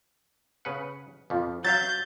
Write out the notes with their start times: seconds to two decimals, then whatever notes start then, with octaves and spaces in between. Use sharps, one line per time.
0.65 C#3 B4 F#5
1.30 F2 F3
1.65 F#3 E5 F5 G6 A6